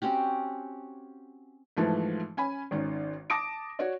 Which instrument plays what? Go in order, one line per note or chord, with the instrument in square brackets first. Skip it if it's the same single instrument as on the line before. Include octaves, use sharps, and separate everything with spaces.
[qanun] C4 C#4 F#4 G4
[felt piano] G#2 E3 F3 A3 E4
C#4 G#5 B5
G#1 D#3 C#4
A5 D6 D#6 A#6 D7
F#4 C#5 D5